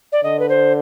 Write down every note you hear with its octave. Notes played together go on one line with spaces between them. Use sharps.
D5
D3 D#5
B4
C5